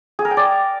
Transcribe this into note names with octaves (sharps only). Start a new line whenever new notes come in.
G#4
A#4
G5
D5